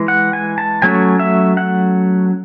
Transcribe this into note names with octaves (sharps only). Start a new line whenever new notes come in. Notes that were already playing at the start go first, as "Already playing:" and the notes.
Already playing: E3 G#3
F#5
G#5
A5
F#3 A3 C#4 G#5
E5
F#5